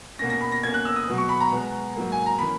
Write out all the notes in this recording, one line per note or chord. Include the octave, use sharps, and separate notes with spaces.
B2 A#3 C#4 A#6
A#6
B5
A#6
B2 A#3 C#4 G#6
F#6
E6
D#6
B2 F#3 B3
C#6
B5
A#5
B2 G#3 B3
G#2 F#3 A#3
G#5
A#5
E3 A#3 C#4 B5